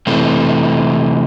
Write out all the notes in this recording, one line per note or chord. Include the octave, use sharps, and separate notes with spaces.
C3 E3 A3